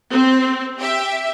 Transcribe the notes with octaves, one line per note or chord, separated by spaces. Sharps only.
C4
G4 E5